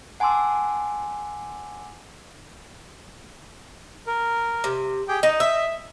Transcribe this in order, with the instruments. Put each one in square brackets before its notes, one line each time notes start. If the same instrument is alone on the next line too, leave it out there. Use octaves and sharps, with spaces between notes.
[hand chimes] F#5 G#5 A5 C6 D6 E6
[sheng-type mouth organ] A#4
[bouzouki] C3
[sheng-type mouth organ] G4 G#4 G5
[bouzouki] D#4 [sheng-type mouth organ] D#5
[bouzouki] E5